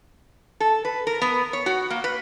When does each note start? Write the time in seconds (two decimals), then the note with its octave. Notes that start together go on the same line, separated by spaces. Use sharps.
0.60 A4
0.85 B4
1.07 A#4
1.22 B3
1.53 C#5
1.66 F#4
1.90 A#3
2.04 B4